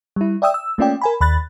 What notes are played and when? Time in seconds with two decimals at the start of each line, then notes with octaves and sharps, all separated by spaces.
0.16 G3 E4
0.42 D5 E5 G5 D#6 E6
0.54 E6
0.78 A3 A#3 C#4 F4 D5 G5
1.01 A#4 G#5 B5
1.21 D#2 B5 F#6 A6